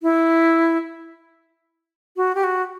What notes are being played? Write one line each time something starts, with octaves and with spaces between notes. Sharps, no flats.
E4
F#4
G4
F#4